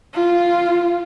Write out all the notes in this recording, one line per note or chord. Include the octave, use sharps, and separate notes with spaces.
F4